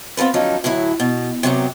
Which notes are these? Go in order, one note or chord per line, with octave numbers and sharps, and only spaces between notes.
B3 C4 F4 A4 B4
D3 F3 F#3 C#4 D#4
A2 D3 F#3 E4
B2
C3 F#3 B3 G4